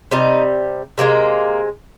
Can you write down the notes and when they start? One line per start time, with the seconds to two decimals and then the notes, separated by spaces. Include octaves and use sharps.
0.11 C3 G3 D#4
0.98 C3 F3 G#3 A#3